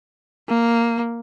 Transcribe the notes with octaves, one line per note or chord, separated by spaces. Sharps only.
A#3